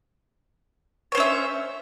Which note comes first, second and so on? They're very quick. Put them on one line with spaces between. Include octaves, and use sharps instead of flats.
C#5 C5 C#4 E5